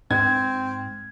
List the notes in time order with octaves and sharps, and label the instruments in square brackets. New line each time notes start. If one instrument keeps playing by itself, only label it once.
[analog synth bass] G#2 [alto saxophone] C4 [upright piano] G#6